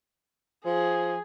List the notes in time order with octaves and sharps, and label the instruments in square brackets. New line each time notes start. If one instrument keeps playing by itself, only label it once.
[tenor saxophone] F3 [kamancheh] G#4